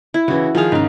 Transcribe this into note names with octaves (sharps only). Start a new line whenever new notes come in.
E4
C#3 E3 F#4
D#3 F3 G#4 F5
G#2 C#3 D#4 F5